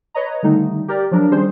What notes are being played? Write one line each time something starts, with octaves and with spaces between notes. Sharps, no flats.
B4 C#5 D#5 A#5
D3 D#3 G3 A3 D#4
G4 A#4 D5
F3 F#3 D4 A#4
D#3 G3 C#4 G#4 C5